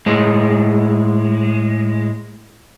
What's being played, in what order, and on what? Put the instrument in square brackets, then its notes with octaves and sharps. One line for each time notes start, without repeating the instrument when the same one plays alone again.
[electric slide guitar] A2 G#3